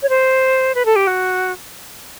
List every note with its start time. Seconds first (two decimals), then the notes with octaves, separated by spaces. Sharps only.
0.03 C#5
0.09 C5
0.75 B4
0.85 A4
0.96 G4
1.07 F#4